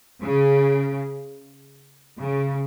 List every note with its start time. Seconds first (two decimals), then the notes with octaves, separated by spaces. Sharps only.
0.22 C#3
2.19 C#3